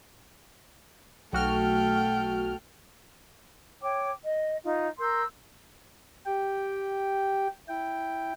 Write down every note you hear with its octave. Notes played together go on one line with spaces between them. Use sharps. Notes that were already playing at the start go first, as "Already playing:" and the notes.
B1 A3 F#4 A4 G5 F6
C#5 G5 D6
D#5
D#4 F4
A#4 C6 E6 G6
G4 G5
E4 G5